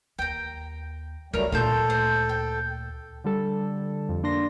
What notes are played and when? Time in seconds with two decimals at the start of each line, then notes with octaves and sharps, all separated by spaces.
0.19 D#2 G5 A#5
1.34 C#2 E3 F#3 G3 A3 A#4 A#5
1.52 D2 A#2 F4 A4 A5 G6
1.90 C5
2.29 G5
3.24 D3 G3 A4
4.09 F2
4.23 A#3 D4 C6 A#6